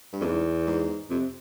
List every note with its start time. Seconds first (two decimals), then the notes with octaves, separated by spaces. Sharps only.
0.13 G2
0.21 F2
0.25 E2 G#2
0.67 G#2
1.10 F2 C3